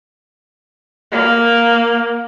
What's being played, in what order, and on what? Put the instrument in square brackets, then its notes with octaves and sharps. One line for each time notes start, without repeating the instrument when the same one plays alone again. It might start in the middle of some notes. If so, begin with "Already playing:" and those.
[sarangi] A#3